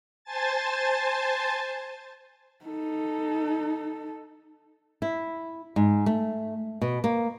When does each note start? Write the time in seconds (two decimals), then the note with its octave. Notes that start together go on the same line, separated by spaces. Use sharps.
0.24 C5 G#5 A5 A6
2.65 D#4 A4
5.02 E4
5.76 G#2
6.06 A3
6.82 B2
7.04 A#3